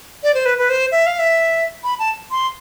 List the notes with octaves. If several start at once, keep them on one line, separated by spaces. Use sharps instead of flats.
D5
C5
B4
B4
C5
E5
F5
E5
B5
A5
C6